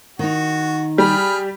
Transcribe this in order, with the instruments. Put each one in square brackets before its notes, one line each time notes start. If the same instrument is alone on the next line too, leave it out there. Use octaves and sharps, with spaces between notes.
[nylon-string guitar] D#3 D#4 [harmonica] F#4
[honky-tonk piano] G3 [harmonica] G#4 B5 F6